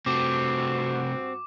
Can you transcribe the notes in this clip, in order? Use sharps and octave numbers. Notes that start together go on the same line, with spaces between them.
G2 C3 A3 C4 F#4 D6